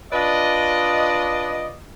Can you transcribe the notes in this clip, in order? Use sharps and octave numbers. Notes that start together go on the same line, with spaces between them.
D4 F4 B4 D5 D#5